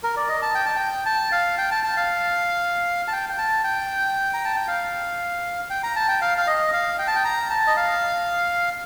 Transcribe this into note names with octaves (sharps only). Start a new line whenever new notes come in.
A#4
D5
D#5
A5
G5
A5
G5
A5
F5
G5
A5
A5
F5
A5
G5
G5
A5
G5
A#5
A5
G5
F5
G5
A#5
A5
G5
F5
F5
D#5
F5
G5
A5
G5
A#5
A5
D#5
F5